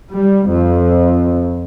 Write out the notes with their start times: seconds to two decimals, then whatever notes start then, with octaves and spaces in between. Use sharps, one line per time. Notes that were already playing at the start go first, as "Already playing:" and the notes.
0.12 G3
0.49 F2